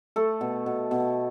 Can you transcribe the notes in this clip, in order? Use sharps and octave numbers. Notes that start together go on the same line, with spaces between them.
A3 A4
B2
B2
B2